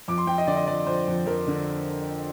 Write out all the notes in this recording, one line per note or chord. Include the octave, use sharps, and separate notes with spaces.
F2 D6
C6
F2 G5
D#5
D3 D5
D#5
F2 D5
F2 C5
F2
F2 A#4
D3